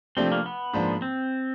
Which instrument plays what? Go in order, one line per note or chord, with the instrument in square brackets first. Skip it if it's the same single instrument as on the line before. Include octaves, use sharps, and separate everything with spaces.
[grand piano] C3 F3 A3 D4 G4 [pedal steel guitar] C4
[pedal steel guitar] A#3
B3
[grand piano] G#2 F3 A#3 D4
[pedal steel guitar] C4